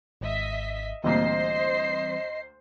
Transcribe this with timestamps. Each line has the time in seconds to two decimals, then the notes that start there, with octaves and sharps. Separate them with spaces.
0.21 G#1 G#2 D#5 E5 B6
1.04 D2 A#2 E3 G3 C4 C5 D#5 C7